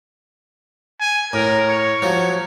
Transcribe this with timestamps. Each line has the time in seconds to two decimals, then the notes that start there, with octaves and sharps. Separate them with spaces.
1.00 G#5
1.33 A2 A#4
1.69 C#5
2.02 F3 F#3